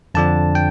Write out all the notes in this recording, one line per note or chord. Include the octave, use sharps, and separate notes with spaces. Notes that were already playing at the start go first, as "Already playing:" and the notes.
F2 D3 F3 D4 A5
G5